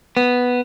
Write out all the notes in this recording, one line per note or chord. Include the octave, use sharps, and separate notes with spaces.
B3